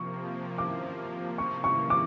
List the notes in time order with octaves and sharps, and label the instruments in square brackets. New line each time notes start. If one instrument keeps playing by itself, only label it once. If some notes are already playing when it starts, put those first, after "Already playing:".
Already playing: [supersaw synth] C3 F3 A#3 [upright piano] C#6
[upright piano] D6
C#6
C#6
D6